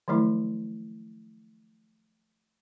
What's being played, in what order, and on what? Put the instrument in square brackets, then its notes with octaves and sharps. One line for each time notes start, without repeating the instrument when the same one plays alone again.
[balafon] D#3 F3 F#3 A3 E4